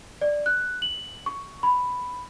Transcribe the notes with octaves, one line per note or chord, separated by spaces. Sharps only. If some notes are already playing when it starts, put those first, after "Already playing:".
D5
F#6
F#7
C#6
B5